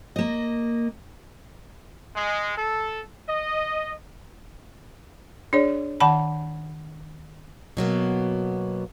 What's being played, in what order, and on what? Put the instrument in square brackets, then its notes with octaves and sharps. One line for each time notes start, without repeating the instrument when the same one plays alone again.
[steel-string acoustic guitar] A#3 D#5
[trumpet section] G#3
A4
D#5
[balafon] D4 G#4 C#5 D5
D#3 F#5 A5 B5
[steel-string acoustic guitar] B2 F#3 A#3 B3